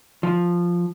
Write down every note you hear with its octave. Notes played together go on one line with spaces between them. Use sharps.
F3